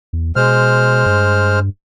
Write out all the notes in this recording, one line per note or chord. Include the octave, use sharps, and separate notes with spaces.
E2
B2 G#3 C5 F6
G2